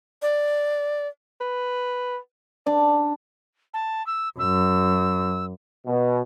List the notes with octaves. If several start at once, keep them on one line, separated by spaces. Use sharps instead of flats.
D5
B4
D4 D5
A5
E6
F#2 E6
B2